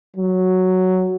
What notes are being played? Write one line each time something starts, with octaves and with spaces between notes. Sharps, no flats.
F#3